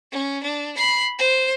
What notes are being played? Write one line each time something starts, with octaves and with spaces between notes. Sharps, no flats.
C#4
D4
B5 C7
C5